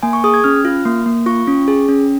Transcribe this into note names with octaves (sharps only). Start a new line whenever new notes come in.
A#3 G#5
C#6
G#4 D#6
G#6
C#4 F6
F4
A#3
A#3
F4 C#6
C#4
G#4
C#4